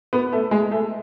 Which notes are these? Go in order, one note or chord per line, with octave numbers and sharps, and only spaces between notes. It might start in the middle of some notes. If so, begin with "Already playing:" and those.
B3
A3
G#3
A3